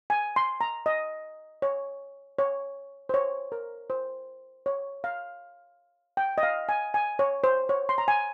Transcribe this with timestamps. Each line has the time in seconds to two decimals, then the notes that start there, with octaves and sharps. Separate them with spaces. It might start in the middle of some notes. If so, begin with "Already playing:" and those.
0.10 G#5
0.36 C6
0.61 A#5
0.86 D#5
1.62 C#5
2.39 C#5
3.09 C5
3.14 C#5
3.52 A#4
3.90 C5
4.66 C#5
5.04 F5
6.17 G5
6.38 D#5
6.43 F5
6.69 G#5
6.94 G#5
7.19 C#5
7.44 C5
7.69 C#5
7.89 C6
7.98 A#5
8.08 G#5